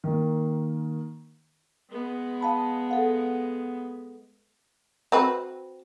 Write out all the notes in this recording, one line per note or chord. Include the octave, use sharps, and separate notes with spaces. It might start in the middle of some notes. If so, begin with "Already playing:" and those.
D#3 A#3
G#3 B3
F5 A5 B5
A4 F5 F#5
C4 F#4 B4